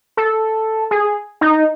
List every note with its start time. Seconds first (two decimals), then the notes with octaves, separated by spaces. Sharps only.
0.17 A4
0.91 G#4
1.41 D#4